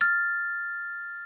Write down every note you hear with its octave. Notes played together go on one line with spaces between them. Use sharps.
F6 A6